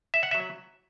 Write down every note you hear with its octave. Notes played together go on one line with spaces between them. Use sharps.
E5
F#5
F#3 E5